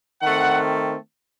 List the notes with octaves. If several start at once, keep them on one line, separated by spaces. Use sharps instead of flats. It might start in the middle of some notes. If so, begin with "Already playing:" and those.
D#3 A3 C4 F#5